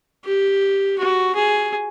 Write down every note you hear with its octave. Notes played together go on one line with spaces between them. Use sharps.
G4
F#4
G#4